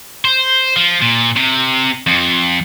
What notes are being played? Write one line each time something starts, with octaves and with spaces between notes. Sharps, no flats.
C5
F3
A#2
C3
F2